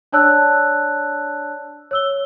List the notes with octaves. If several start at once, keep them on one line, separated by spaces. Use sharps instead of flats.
D4 C#5 D5 A5 E6 F#6
C#5 E6 G7